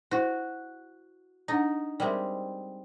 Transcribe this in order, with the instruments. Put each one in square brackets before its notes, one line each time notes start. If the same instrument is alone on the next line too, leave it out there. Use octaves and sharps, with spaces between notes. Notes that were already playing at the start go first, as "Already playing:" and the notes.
[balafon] E4 C5 [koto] F#4
[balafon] D4 F#5 [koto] D#4
[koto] G3 G#3 C4 [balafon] A#4 E5